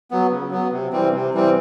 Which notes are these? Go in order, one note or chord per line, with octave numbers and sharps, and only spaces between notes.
F#3 B3
C#3
F#3 B3
C3
E3 G3 C4
C3
E3 G3 C4